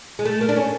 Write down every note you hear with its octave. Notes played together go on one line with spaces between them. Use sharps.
G#3
A3
A#3
D4
C#4